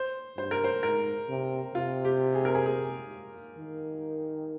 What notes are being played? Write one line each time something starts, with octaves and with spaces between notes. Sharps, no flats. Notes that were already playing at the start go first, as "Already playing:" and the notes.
Already playing: C5
G2 C5
A#4
C5
G#2 A#4
C3
C3 F4
G4
G#4
A#4
G#4
G#4
D#3